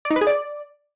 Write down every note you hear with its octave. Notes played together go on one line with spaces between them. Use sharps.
D5
D#4
B4
G#4
D5